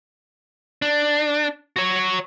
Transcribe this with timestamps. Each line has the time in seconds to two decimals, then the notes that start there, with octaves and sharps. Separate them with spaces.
0.82 D4
1.76 F#4 C#5